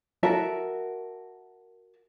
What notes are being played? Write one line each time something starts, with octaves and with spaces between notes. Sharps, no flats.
F#4 A#4 E5 A5